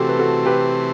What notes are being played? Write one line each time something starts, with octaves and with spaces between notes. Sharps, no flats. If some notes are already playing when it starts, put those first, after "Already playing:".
Already playing: C3 E3 A3 C4 F#4 G4 A4
B4
F#4 A4
G4 B4